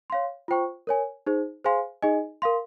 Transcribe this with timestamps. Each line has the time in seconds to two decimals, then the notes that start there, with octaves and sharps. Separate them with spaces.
0.10 C#5 F5 C6
0.48 F4 C5 G5 C#6
0.87 A#4 C#5 G#5
1.27 D#4 G#4 C5
1.64 G#4 C5 F5 G#5 C6
2.02 D#4 G#4 D#5 G#5
2.42 A#4 F5 C6